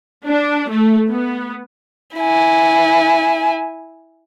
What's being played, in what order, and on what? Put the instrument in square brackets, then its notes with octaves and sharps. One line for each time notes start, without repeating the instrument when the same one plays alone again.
[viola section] D4
A3
B3
[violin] E4 G#5